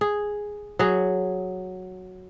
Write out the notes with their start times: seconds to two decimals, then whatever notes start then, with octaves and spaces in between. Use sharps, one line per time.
0.01 G#4
0.79 F#3 G#4